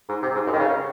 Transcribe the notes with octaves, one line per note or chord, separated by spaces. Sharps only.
G#2
C3
G#2
F#2
D#3
C#3